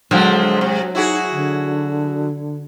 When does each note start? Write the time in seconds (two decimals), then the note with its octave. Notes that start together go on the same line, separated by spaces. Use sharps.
0.11 D3 F3 F#3 G#3 C4
0.61 C3
0.95 D#4 E4 F#4 G#4
1.32 D3